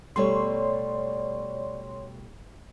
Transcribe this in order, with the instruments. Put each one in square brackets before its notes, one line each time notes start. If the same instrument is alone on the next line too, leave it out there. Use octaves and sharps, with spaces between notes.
[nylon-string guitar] B2 G3 A3 [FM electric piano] C#5 C6 [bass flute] D5